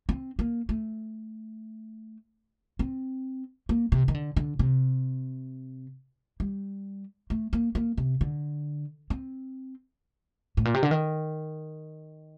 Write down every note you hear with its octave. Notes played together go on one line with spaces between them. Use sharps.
C4
A#3
A3
C4
A#3
C3
D#3
D3
D3
C3
G3
A3
A#3
A#3
C3
D3
C4
A2
A#2
C3
D3
D#3